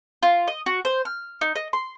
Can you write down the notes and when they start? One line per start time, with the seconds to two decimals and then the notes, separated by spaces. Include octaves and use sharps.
0.23 F4
0.48 D#5
0.66 F#4
0.85 C5
1.05 F6
1.41 D#4
1.55 D#5
1.73 C6